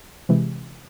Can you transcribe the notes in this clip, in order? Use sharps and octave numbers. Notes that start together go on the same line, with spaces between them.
C3 E3 G#3